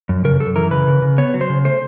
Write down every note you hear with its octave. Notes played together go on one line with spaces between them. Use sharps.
F#2
C#3 A#4
F#2 A4
E3 A#4
C#3 B4
C#3
C#3
B3 C#5
F#3
C5
C#3
A3 C5